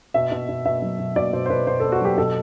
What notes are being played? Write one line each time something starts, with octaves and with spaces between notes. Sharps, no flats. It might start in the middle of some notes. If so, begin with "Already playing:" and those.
B2 E5
B2
B2
B2 E5
F#3
B2
B2 D5
B2 C5
C5
B2 B4
B2 C5
B3 A4
F#4
F#3 G4
B2 A4